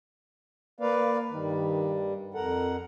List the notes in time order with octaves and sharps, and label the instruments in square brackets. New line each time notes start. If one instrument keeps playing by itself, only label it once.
[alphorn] A#3 [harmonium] B4 D5 F5
[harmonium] G2 G3 [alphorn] D#3
[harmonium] F2 A#4 F#5 [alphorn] A4